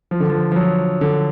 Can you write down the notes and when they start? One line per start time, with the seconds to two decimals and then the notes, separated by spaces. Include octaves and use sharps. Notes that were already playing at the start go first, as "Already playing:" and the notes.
0.11 F3
0.20 D3
0.30 F3
0.52 F3
0.56 F#3
1.01 D3